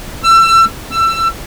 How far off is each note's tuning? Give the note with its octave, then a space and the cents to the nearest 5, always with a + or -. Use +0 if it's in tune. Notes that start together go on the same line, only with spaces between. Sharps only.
E6 +30
E6 +25